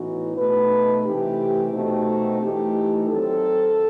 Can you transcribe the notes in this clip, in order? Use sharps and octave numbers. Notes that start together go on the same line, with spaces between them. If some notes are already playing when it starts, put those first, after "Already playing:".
Already playing: A2 E3 B3 D#4 F#4
B2 A3 D#4 B4
C3 E3 A3 G4
B2 A3 C4 D#4 F#4
E3 A3 D#4 G4
D#3 F#3 C4 A4